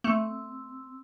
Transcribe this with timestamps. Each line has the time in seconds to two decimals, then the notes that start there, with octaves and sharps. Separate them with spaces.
0.04 A3 C4 E6